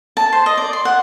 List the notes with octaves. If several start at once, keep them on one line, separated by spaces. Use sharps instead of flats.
A5
C5
D#5
D5
C6
F#5